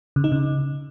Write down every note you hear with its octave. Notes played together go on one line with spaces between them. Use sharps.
C#3
D#4
C#3